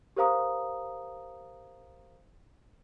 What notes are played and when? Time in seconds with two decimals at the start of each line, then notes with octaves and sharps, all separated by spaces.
0.16 G4 A#4 C5 F5 A#5 D#6